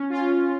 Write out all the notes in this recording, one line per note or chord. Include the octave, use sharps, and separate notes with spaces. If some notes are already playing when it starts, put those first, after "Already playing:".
Already playing: C#4
F4